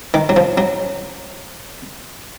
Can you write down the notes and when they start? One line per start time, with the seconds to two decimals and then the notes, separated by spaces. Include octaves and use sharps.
0.14 D#3
0.29 F#3
0.36 F3
0.58 F#3